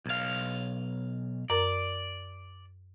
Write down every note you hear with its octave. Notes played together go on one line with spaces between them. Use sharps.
B1 F5
F#2 A#4 D5 A#5